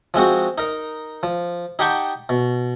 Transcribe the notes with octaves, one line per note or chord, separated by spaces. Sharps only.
F3 G#3 C4 F#4
D#4 A#4
F3
D#4 G4 F#5 G5 A5 C#6
B2